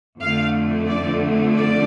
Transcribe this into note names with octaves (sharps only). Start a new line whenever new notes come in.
F2 D3 A3 F5
D5
D5